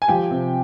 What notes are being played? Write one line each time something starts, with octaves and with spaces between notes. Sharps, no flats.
G#5
F3 G4 G5
C3